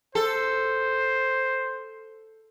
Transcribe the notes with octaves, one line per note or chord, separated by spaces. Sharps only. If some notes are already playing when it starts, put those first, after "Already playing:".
A4 C5